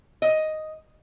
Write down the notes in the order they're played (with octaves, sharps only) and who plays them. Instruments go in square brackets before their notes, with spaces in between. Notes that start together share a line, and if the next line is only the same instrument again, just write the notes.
[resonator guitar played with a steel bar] D#5